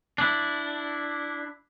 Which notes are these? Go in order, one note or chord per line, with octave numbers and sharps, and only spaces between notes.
D4 E4